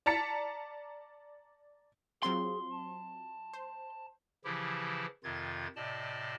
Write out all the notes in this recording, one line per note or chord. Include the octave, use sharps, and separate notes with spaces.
D5 A5 A#5 A6 B6 C#7
F#3 C4 F4 G#4 C6
A5
C5
C#3 E3 F3 E4 G4
F2 C3 D#3 F4 G#6 A6
A2 C3 D5 D#5 A5